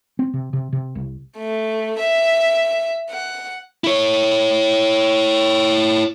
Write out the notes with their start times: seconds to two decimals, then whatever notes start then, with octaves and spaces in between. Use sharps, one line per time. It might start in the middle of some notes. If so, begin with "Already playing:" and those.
0.19 C4
0.34 C3
0.53 C3
0.73 C3
0.95 C2
1.38 A3
2.00 E5
3.10 F#5
3.84 E4 C#5